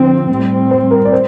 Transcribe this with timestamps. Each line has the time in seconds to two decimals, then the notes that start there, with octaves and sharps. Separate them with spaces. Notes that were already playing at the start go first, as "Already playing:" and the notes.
Already playing: D3 F3 C4 C5
0.29 A2 G3 C4
0.71 C5
0.91 A#4
1.05 D5
1.12 C5